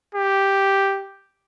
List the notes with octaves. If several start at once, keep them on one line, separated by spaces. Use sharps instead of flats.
G4